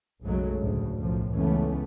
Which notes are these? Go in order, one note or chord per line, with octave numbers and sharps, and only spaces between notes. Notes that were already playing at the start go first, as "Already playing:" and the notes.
B1 F#2 C#3 F#3 G#3 A3
D2 A2 C#3
B1 F#2 A2 F3
C#2 F#2 E3 A3 B3 C#4